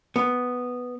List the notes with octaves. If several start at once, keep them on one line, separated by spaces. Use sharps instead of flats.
B3